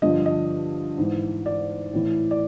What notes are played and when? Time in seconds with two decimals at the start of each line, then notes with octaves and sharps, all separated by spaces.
0.02 G2 D3 F3 D#5
0.26 D#5
0.98 G#2 E3
1.46 D5
1.93 A2 E3
2.31 D5